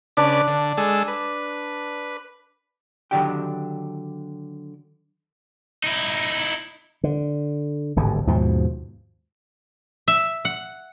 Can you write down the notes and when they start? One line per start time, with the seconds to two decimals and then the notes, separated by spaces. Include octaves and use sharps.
0.17 C#3 D4 B4 D5
0.47 D3
0.78 G#3 A4 E6
1.08 B4
3.11 D3 D#3 F#3 D4 G4 G5
5.84 D#4 E4
7.03 D3
7.96 D1 G#1 G2 D3
8.27 D#2 G#2 B2 F3
10.08 E5
10.45 F#5